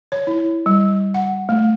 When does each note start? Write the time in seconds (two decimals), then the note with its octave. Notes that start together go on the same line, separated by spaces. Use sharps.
0.12 C#5
0.27 E4
0.66 G3
1.14 F#5
1.49 A3